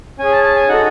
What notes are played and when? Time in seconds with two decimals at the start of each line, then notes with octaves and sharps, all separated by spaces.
0.19 C#4 G#4 G#5
0.32 A5
0.43 A5
0.56 G#5
0.68 D#4 F#4 A4 F#5